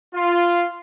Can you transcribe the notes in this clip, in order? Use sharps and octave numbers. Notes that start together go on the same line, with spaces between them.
F4